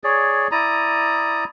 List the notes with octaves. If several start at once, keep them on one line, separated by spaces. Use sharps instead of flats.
G#4 C#5 D5
E4 D5 A#5 D#6